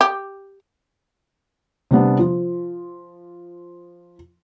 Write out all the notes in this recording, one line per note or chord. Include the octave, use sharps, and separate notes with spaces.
G4
C3 G3 B3 D4
F3